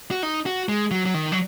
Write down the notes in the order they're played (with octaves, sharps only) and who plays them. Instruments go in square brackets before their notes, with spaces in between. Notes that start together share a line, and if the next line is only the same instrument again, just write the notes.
[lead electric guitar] F#4
D#4
F#4
G#3
F#3
F#3
D#3
F#3